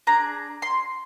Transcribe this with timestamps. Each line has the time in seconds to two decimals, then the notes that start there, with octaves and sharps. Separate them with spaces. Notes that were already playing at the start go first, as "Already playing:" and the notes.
0.07 D4 G#4 A#5
0.62 C6